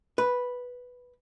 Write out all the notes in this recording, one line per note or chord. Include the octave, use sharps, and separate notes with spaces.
B4